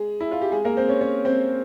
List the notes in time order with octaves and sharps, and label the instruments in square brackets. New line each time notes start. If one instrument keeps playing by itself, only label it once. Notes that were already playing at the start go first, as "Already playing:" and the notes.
Already playing: [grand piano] G#3 G#4
E4
F4
G4
G#3 G#4
A#3 A#4
C4 C5
C#4 C#5
C#4 C#5
C4 C5